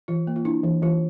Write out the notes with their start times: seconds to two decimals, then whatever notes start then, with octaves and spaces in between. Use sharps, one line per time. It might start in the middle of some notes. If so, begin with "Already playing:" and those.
0.08 E3 F4
0.27 A#3
0.36 F4
0.45 D4 E4
0.64 E3
0.82 E3 F4